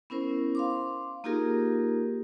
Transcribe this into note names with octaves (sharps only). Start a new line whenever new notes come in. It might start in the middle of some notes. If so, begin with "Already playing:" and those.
B3 C#4 E4 A#4 C5
F5 C6 D6
A#3 D#4 F4 G4 G#4 A#4